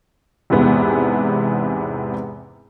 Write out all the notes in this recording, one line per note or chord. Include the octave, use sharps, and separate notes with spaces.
E2 G#2 C3 B3